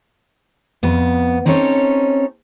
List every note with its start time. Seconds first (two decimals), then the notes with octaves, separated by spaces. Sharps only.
0.83 F2 B3
1.46 C4 C#4 D#4 A4 C#5